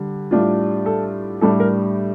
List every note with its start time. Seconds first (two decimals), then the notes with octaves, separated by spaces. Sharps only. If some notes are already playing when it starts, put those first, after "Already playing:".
Already playing: D3 G3
0.31 A2 G3 D4 F4
0.86 A4
1.41 A2 G3 D4 A4
1.60 A#4